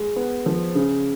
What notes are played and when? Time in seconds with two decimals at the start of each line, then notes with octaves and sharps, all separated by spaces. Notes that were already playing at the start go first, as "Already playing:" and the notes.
Already playing: G#3
0.16 B3
0.46 F3
0.75 C#3